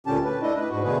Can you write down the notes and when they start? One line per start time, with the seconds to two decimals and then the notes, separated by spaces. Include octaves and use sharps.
0.07 D2 A#2 D3 C#4 G4 A5
0.24 B4
0.42 A3 D4 E4 D#5
0.55 B4
0.70 G#2 F#4
0.84 B2 D3 A3 G#4 B4